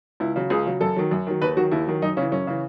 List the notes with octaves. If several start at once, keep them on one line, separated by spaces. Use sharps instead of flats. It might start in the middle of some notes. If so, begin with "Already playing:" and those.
C#2 E4
C#3 F#3
C#2 G#4
C#3 F#3
F#2 A4
D#3 F#3
F#2
D#3 F#3
D#2 B4
D#3 F#3 F#4
D#2 E4
D#3 F#3
F#2 D#4
C#3 E3 C#4
F#2 C#4
C#3 E3